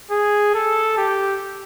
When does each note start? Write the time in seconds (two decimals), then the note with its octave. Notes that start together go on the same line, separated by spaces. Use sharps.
0.11 G#4
0.54 A4
0.98 G4